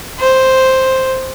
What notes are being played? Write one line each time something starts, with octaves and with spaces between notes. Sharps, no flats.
C5